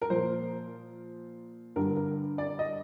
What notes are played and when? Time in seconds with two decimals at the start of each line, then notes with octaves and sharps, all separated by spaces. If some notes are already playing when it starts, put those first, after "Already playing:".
0.02 A#4
0.10 A#2 F3 C5
1.76 G2 D3 G3 A#4
1.96 A#4
2.38 D5
2.59 D#5